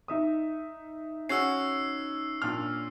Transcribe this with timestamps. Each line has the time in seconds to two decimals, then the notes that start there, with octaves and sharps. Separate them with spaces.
0.08 D#4 E5 D#6
1.29 C#4 F#4 E6 C7
2.42 A#2 D4 F6